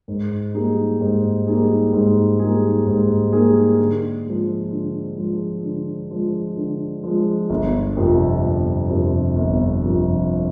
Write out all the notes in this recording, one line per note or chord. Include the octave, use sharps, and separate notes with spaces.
G#2
G3 A#3 D#4 G#4
G#2
G3 A#3 D#4 G#4
G#2
G3 A#3 D#4 G#4
G#2
G3 A#3 D#4 G#4
D3
F3 G#3
D3
F3 G#3
D3
F3 G#3
D3
F3 G#3
G1
F2 C3 F3
G1
F2 C3 F3
G1
F2 C3 F3